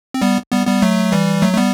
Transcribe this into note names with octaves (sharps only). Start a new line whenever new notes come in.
C4
G3 B3
G3 B3
G3 B3
F#3 A3
E3 G3
F#3 A3
A3
G3 B3